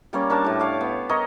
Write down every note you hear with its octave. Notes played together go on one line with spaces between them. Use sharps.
G3 A#3 C#4 D5
D4 A#4 A5 D6
A2 G4
C#5 F5 D6
B3
A#4 C#5 D#5 B5